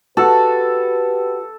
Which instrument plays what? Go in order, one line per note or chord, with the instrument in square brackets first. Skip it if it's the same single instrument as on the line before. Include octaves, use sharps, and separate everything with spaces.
[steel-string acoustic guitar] F#4 [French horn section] G4 B4 [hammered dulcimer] A4